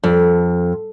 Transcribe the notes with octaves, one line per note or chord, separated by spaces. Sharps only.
F2